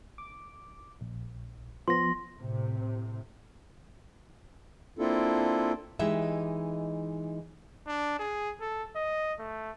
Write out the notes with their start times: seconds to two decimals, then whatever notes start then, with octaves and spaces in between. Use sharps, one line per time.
0.18 D6
1.01 A#1
1.88 F3 B3 C6 A#6
2.37 A2 C3
4.99 A#3 C4 D4 E4 F4 A4
5.99 E3 G#3 D#4 G4 E5
7.87 D4
8.19 G#4
8.61 A4
8.96 D#5
9.39 A3